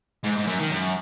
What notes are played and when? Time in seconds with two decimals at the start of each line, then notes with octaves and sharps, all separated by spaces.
0.24 G#2
0.37 G#2
0.47 F#2
0.60 D#3
0.71 F#2